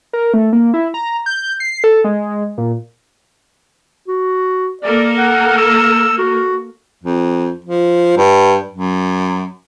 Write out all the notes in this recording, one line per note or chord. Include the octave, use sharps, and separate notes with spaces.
A#4
A3
A#3
E4
A#5
G6
C7
A4
G#3
A#2
F#4
A#3 A4 A#4 D5
F#5
E6
F#4
F2
F3
G2
F#2